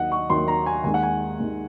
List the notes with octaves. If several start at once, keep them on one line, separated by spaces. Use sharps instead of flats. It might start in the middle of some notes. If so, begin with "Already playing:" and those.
Already playing: D#2 D#3 F#3 D#5 F#5
C#6
D#2 D#3 F#3 C6
A#5
G#5
D#2 D#3 G#3 G#5
F#5
G#5
D#2 D#3 G#3